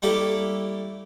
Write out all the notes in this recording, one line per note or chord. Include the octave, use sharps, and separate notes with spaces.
G3 A3 A#3 E4 G4 A4